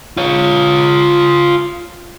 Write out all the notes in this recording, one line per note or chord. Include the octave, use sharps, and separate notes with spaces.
F4 C#5